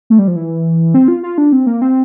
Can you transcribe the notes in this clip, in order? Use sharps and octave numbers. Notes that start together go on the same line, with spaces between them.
A3
G3
F3
E3
C4
F4
F4
D4
C4
A#3
C4